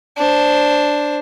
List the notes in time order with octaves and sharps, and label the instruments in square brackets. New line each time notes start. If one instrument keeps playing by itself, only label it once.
[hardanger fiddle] D4 C5